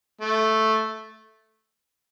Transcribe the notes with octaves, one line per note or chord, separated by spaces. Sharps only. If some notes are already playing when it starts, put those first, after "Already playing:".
A3